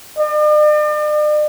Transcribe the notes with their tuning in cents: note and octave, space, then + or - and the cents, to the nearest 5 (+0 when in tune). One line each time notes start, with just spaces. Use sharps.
D5 +45